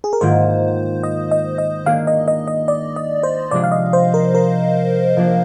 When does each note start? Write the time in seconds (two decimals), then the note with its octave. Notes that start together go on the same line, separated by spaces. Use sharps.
0.04 G#4
0.13 A#4
0.21 G#2 D#3 A#3 F4 C5
1.03 D#5
1.31 D#5
1.58 D#5
1.86 D#3 A#3 D4 G#4 F5
2.07 D#5
2.28 D#5
2.47 D#5
2.68 D5
2.96 D#5
3.23 C5
3.51 C3 F3 G#3 D4 D5
3.64 F5
3.72 D#5
3.93 C5
4.14 A#4
4.35 A#4
5.17 F3 A#3 D4